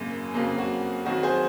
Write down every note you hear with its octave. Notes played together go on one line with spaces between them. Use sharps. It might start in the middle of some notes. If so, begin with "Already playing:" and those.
Already playing: G#1 F#2 C#3 F#3 A#3
F2 C#3 F#3 A#3
F#4
F2 D#3 F#3 F#4
G#4 C5